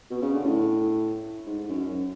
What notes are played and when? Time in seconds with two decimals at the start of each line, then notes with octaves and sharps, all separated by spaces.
0.10 B2
0.22 C#3
0.34 D3
0.44 A2
1.46 G#2
1.69 F#2